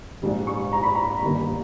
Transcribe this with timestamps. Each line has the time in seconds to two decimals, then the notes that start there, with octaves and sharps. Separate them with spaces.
0.22 A#1 G#2 G3
0.47 C#6
0.73 A#5
0.83 B5
0.95 A#5
1.22 G1 G2 D#3 A#3